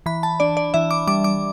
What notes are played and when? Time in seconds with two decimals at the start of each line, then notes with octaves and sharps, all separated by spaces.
0.06 E3 B5
0.23 A5
0.40 D4 D5
0.57 D5
0.74 E3 E5
0.91 D6
1.07 G3 D6
1.24 D6